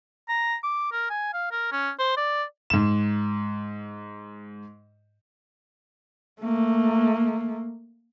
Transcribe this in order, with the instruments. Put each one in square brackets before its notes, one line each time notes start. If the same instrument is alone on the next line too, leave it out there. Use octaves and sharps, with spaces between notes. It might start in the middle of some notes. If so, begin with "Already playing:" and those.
[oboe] A#5
D6
A#4
G#5
F5
A#4
C#4
C5
D5
[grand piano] G#2 E7
[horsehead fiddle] A3 A#3